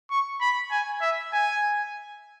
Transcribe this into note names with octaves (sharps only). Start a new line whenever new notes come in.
C#6
B5
G#5
E5
G#5